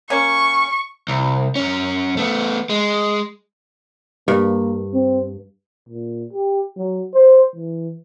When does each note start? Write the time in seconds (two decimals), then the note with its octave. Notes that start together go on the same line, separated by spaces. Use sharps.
0.10 A#3 C#4 C#6
1.08 C2
1.55 F#2 C#4
2.17 A3 B3
2.69 G#3
4.28 G2 A#3
4.93 C4
5.89 A#2
6.33 G4
6.77 F#3
7.14 C5
7.56 E3